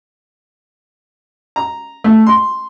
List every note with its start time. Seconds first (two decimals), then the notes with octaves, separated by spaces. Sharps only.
1.56 A#5
2.04 A3
2.27 C6